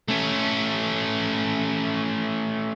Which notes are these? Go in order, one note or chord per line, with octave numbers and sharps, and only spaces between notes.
A3 C#4